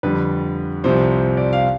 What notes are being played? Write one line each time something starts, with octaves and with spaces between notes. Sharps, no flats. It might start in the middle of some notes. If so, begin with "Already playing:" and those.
F2 D3 G3 B4
C2 C3 F3 C5
C5
D5
F5